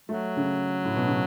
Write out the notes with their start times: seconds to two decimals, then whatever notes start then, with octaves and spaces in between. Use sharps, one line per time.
0.09 F#3 A3
0.37 C#3
0.85 A2
0.96 B2
1.08 C#3